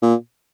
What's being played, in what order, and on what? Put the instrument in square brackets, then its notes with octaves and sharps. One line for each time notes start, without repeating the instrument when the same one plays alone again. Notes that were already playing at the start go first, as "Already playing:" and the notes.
[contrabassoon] A#2